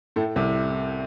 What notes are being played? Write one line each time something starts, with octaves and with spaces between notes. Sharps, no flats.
A2 A3
C2 C3